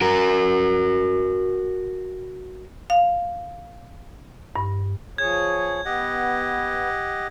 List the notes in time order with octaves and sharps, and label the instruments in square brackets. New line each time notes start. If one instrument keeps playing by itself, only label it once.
[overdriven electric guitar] F#4 A#4
[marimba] F5
G2
[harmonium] F3 G#4 C#5 [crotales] G#6
[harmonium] B3 [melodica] G4 D#5 F#5